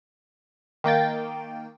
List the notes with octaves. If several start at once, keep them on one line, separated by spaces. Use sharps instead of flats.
D#3 A#3 G5 A6